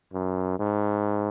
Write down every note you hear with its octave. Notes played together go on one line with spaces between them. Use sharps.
F#2
G#2